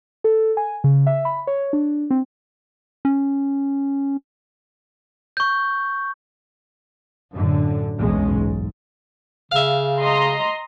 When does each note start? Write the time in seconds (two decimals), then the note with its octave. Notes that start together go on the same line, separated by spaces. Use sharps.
0.24 A4
0.57 G#5
0.84 C#3
1.07 E5
1.25 B5
1.47 C#5
1.73 D4
2.11 C4
3.05 C#4
5.37 C#6 G6
7.33 F#2 A2 D3
7.96 F#1 B1 E2 B2 G#3 C#4
8.32 G#2
9.52 C#3 E5 F5
10.00 D#5 A#5 C6